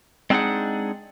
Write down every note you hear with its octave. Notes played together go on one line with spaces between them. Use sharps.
G#3 C4 D4 D#4 G#4 F#5